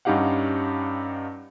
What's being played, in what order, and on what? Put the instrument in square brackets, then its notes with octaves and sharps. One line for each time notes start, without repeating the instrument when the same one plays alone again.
[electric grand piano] G2 C#4 D#4 G4 F5 F#5